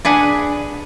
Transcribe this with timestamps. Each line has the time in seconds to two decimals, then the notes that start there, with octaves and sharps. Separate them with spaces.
0.05 D4 G#4 B4 F#5 G#5